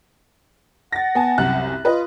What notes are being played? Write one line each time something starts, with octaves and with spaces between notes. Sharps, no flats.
F#5 A6 A#6
B3 G#5 A5
C2 F#2 F#6
F4 B4 D#5